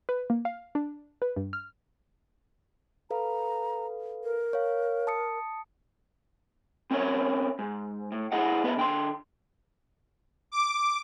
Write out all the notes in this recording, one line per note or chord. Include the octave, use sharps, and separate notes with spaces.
B4
A#3
F5
D4
B4
G2
F6
A4 B4 F5 A#5
A#4
C#5 F5
A5 D#6 C#7
C4 C#4 A#4 C5 C#5 E5
G#2
A2
E4 G#4 D#5 F#5
B3 B4 D#5 E5
D3 G5 C6
D6